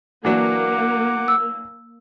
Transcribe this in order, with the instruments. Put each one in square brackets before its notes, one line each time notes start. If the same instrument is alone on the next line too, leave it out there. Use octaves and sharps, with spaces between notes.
[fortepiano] E3 F#3 D4 [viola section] A#3 [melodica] F#5 D6
[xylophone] E6